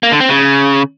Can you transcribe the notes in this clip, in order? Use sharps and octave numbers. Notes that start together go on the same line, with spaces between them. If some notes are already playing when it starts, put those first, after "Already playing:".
A#3
D3
C4
C#3